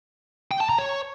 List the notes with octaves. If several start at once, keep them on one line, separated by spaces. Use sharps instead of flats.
G5
A5
A#5
C#5